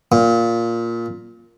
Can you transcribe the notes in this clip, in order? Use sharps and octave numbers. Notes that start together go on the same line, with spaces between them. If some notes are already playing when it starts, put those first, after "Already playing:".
A#2